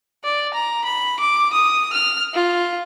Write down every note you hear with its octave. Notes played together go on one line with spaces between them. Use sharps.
D5
A#5
B5
D6
D#6
F6
F4